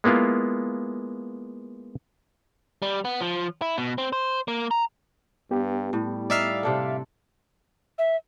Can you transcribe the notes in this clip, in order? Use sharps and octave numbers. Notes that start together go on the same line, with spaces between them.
G#3 A#3 B3 E4 F4
G3
B3
F3
E4
B2
C4
C5
A#3
A#5
G2 B3 G4
A2 G3
D#4 D5 E5 F5
C3 D4 A4
E5